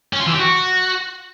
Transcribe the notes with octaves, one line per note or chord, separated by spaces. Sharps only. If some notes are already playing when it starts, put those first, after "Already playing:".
C#4
F4
E3
G4
F#4